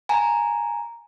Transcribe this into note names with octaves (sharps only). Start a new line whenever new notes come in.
G#5 A#5